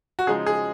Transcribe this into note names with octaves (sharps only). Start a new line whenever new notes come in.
F#4
C#3 F3 G#3 D#4 G#4
G#4